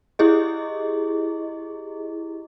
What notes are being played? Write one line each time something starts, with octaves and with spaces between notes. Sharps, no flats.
E4 G4 G#4 D#5